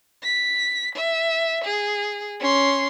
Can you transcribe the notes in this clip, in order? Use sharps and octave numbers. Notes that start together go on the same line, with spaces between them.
B6
E5
G#4
C#4 C6